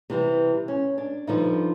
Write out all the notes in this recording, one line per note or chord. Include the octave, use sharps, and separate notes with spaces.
C3 E3 G3
C#4
D4
G2 D3 F3 D#4